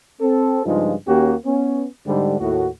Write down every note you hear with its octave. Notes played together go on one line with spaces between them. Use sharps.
C4 A4
G2 C#3 F3 G#3 D#4 F4
D#2 A#3 C#4 F#4 G4
B3 C#4
G#2 D3 G3
D#2 A2 F#4